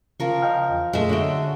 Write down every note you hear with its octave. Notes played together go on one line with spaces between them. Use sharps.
C#3 F3 A#4 C#6
D#5 G5 F6
E2
F#2 A#2 G#3 A3 E5
D3 F#4 C#5 E5 G5